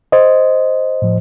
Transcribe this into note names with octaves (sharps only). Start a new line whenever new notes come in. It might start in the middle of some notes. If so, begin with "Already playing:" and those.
C5 D#5
A2 F3